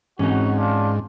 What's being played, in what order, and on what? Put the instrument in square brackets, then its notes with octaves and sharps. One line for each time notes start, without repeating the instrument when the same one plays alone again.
[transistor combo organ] G#2 [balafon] E3 C4 [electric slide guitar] C#4 D#4 [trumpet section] F#4
[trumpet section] D4 F4